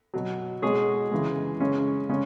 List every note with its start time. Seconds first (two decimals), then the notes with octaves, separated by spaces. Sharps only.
0.14 B2 F#3
0.62 B2 G#3 G#4 C#5
1.11 C#3 E3 G#3
1.60 C#3 G#3 C#4
2.09 C#3 G#3 C#4